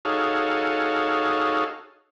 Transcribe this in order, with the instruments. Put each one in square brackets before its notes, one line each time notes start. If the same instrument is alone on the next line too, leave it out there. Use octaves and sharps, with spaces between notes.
[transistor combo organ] D#4 F#4 G#4 A4 C#5 F5